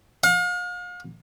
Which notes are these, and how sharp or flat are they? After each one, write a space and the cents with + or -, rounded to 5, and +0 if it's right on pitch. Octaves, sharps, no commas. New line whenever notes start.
F5 +40